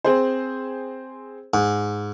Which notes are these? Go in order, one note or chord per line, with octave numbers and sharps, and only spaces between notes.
C4 G#4 C5
G#2